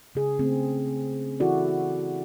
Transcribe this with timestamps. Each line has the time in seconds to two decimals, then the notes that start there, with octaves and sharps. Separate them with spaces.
0.15 C#3 G#4
0.39 C#3 A3 C4
1.40 E3 E4 F#4 A4 D5